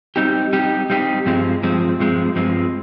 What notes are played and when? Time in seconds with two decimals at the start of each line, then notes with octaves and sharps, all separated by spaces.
0.16 G3 C4 D#4 G4
0.53 G3 C4 D#4 G4
0.90 G3 C4 D#4 G4
1.26 G2 F3 G#3 C4
1.63 G2 F3 G#3 C4
1.99 G2 F3 G#3 C4
2.36 G2 F3 G#3 C4